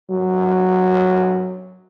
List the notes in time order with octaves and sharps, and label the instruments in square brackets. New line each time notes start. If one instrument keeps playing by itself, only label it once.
[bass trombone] F#3